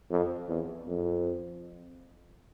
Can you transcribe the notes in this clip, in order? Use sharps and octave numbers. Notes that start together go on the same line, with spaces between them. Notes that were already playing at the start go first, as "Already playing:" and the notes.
F2
E2
F2